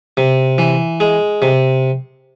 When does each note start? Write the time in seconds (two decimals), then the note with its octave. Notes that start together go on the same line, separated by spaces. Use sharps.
0.17 C3
0.58 E3
1.00 G#3
1.42 C3